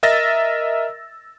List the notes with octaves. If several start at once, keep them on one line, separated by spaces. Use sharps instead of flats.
A#4 D#5 E5 E6 A6 A#6